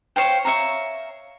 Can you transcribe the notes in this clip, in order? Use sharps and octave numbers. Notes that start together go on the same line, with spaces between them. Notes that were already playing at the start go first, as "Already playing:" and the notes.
C5 C#5 F5 G5
C#5 E5 F5 A#5